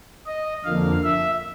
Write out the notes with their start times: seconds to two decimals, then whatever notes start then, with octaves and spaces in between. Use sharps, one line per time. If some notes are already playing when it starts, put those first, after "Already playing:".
0.26 D#5
0.64 F2 D3 F3 A#3 F5
1.04 E5